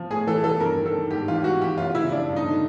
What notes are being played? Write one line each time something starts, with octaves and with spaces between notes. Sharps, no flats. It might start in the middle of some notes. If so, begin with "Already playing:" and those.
Already playing: F3
A2 G#4
E3 A4
E3 A4
G2 A#4
D#3
A4
D#3
G#2 G4
E3 F4
G4
E3 F#4
E3 G4
F#2 F4
C#3 E4
F3 D4
G2
D#4
D3